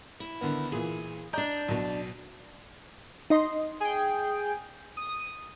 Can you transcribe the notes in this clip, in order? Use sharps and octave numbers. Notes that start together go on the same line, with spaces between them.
E4
D3 D#3 B3
A#2 E3 G#4
D4 D5 D#5 A#5 G6
B1 B2
D#4 D#5 C6
G#4 G5
D#6